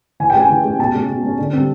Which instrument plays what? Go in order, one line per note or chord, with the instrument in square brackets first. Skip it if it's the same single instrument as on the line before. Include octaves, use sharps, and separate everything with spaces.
[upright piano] E3 G#5
G5
G#3 C#4 G#5
E3
G#3 C#4
B2 A5
G#3 C#4
B2
G#3 C#4
D3
G3 C4